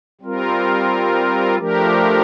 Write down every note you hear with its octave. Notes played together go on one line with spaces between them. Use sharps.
G3 C4 F4 A#4
F3 A3 D4 G4 A#4